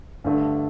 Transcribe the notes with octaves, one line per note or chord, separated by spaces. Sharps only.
G2 D3 A3